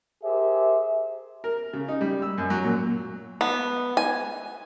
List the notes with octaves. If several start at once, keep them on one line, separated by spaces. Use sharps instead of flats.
G4 G#4 A#4 C5 E5
A#4
C#3
D#4
G3
E6
F#2
F#3
A#2
B3
G#5